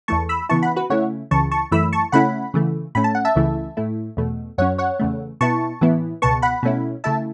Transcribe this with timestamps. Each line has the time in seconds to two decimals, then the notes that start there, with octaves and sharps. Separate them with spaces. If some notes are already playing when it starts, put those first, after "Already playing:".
0.08 E2 E3 A3 A5 C#6
0.29 B5 E6
0.49 C#3 E3 B3 E4 A5 C#6
0.62 F#5 B5
0.76 F#4 B4
0.90 C#3 A3 C#4 E4 C#5 F#5
1.31 C#2 C#3 E3 A5 C#6
1.51 A5 C#6
1.71 F#2 E3 A3 E4 B5 E6
1.93 A5 C#6
2.12 C#3 A3 C#4 E4 F#5 B5
2.54 C#3 E3 A3
2.95 A2 A3 C#4 B5
3.04 A5
3.15 F#5
3.25 E5 A5
3.35 C#2 C#3 E3 A3 E4
3.77 A2 A3 E4
4.17 E2 B2 A3
4.58 F#2 F#3 C#4 C#5 F#5
4.78 C#5 F#5
5.00 E2 C#3 A3
5.41 B2 B3 E4 A5 C#6
5.81 A2 E3 B3 E4
6.22 C#2 B2 B3 A5 C#6
6.42 F#5 B5
6.63 B2 A3 C#4 E4
7.04 C#3 A3 E4 E5 A5